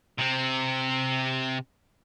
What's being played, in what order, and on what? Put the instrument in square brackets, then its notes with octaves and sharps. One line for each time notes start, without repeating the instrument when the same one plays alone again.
[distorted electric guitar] C3 C4